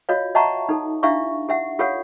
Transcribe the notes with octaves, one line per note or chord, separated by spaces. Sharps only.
F4 F#4 C#5 D#5 F5
D#5 E5 F#5 A5 A#5 C#6
D#4 A4
D4 E4 G4 E5 F5 C#6
G4 E5 F#5
F4 G4 A4 C#5 F5 F#5